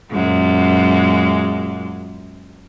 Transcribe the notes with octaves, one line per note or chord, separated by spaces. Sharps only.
F#2 A#2 G#3